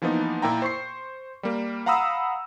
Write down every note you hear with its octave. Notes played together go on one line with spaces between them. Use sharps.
E3 F3 A#3 B3 D#4
A#2 E4 G5 A#5
C5 C#6 C7
G3 A#3
F5 F#5 A#5 B5 D#6 E6